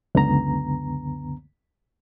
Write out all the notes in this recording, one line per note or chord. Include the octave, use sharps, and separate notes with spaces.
C#2 F#2 D3 B3 A#5